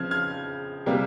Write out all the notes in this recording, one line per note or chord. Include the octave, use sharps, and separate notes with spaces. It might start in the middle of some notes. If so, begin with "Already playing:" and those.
Already playing: C#3 F3 C4 F6 G#6
F6 G#6
C3 G3 A#3